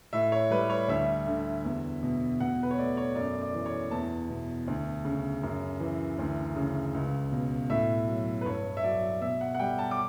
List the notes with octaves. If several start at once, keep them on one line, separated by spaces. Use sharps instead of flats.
A2 E5
C#5
G3 B4
C#5
D2 E5
D3
E2
B2
B2 F#5
B4
C#5
A3 D5
C#5
F#2 D5
D5
E3
C#5
E2 A5
B2
D2
C#3
F#2
E3
D2
C#3
C#2
B2
A2 E5
F#3
B4
G2 C#5
E5
F#3 D5
B2 E5
F#5
F#5
G3 G5
A5
D6